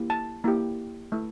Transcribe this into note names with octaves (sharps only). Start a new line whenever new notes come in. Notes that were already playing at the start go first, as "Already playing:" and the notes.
Already playing: A#3 E4 G4
A5
A#3 E4 G4
A3 E4